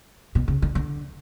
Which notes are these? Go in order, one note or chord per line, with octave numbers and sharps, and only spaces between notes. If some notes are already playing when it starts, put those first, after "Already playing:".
B2
C#3
D3
D3